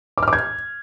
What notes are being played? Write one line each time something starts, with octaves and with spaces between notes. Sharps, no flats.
D6
F6
D6
G#6